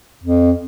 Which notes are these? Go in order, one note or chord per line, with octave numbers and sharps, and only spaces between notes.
F2